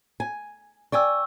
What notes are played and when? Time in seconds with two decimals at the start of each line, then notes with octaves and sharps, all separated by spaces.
0.20 G#5
0.92 D5 G5 G#5 C#6 E6